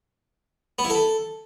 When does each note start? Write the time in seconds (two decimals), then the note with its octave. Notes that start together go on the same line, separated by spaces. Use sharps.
0.79 B3
0.84 E4
0.90 A4